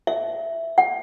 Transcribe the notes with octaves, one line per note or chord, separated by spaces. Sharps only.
E5
F#5